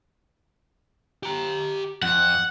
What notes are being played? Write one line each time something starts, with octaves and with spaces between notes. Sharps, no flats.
G4 A#5
F2 F#5